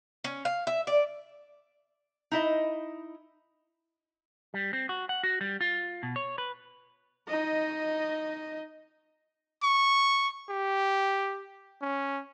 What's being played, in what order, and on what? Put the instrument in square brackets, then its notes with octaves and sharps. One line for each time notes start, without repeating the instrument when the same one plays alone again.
[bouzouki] C#4
F5
E5
D5
[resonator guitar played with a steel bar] D#4 E4 D#5
[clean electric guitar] G3
C4
F#4
F#5
F#4
G3
F4
B2
C#5
B4
[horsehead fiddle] D#4 D#5
[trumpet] C#6
G4
C#4